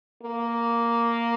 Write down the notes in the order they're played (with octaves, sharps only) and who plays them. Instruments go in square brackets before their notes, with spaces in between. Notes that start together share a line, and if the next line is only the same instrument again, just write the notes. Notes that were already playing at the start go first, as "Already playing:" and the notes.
[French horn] A#3